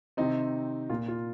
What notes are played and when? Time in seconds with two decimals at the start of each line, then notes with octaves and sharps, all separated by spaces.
0.17 C3 D#3 C4 D#4
0.89 A#2 A#3 F4
1.08 F4